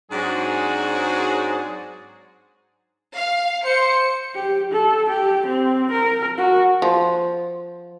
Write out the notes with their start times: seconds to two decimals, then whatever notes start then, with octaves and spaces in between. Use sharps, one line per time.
0.12 G#2 F#3 C4 D4 F#4 G#4
3.16 F5
3.65 C5 C#7
4.35 G4
4.72 A4
5.09 G4
5.47 C4
5.91 A#4
6.37 F#4
6.82 F3